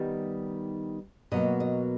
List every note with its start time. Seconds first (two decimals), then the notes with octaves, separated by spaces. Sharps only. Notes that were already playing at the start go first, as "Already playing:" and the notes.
Already playing: D#3 G3 B3 D#4
1.32 B2 F#3 A#3 D#5
1.60 D#5